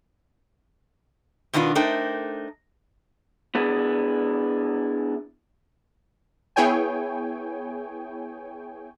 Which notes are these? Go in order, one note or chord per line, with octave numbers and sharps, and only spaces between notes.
B2 D#3 B3 D4 F4
A3 D4 D#4 A#4 C5 G5
B3 D4 E4 G#4
B3 E4 G#4 C#5 G5 G#5